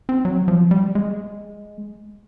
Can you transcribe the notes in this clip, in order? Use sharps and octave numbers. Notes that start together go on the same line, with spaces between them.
C4
F#3
F3
G3
G#3